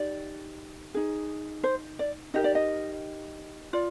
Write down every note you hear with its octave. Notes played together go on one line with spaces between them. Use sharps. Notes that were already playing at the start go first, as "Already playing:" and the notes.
Already playing: D#4 G4 D5
D#4 G#4
C5
D5
D#4 G4 A#4 D#5
D5
D#5
F4 D5